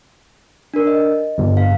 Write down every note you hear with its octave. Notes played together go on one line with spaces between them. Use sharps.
D4 A#4
D#5
G1
F5